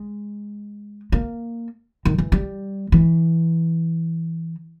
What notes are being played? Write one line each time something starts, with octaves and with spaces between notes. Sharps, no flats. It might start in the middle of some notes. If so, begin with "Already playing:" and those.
Already playing: G#3
A#3
D#3
E3
G3
E3